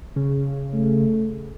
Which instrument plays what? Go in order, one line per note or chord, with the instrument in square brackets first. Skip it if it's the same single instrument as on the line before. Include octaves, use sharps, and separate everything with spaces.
[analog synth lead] C#3
[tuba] A3